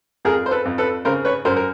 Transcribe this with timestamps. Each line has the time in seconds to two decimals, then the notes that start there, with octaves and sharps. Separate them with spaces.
0.25 F2 G#4 A#4
0.46 C5
0.51 A4 B4
0.65 F2
0.78 A4 B4
1.05 C#3 A#4 C5
1.25 B4 C#5
1.45 F#2 A#4 C5
1.56 A#4